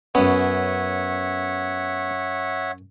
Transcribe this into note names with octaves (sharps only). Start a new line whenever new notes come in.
F#2 B3 C#4 C#5 E5 F#5